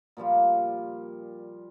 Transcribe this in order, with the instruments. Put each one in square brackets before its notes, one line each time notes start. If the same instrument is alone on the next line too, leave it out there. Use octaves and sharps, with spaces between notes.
[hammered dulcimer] A#2 F3 G3 F4